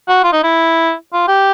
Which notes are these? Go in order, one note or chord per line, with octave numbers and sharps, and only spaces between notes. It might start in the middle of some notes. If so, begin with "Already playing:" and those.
F#4
F4
D#4
E4
F4
G4